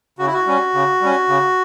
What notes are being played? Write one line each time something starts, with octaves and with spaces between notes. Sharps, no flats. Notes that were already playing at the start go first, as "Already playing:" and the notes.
C#3 F#4
E4
F#4
G3 C#4
C#3
G3 C#4
C#3